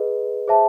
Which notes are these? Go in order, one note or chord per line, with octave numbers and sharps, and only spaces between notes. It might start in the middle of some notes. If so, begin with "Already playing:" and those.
Already playing: G#4 B4 D#5
G#4 C5 E5 A5